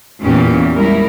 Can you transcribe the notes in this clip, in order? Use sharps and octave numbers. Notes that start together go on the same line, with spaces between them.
E2 A#2 E3 C#4 G4
G3 G#3 E4 A#4